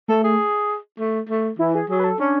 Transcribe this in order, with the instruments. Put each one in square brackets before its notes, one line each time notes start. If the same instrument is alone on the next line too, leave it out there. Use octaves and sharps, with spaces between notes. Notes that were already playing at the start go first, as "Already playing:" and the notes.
[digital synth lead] A3 [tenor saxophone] A4
[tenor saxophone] G#4
A3
A3
[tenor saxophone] E3 [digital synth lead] E4
[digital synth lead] G#4
[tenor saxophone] F#3 [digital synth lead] G#4
[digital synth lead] B4
A4
[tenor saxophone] C#4 [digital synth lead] D4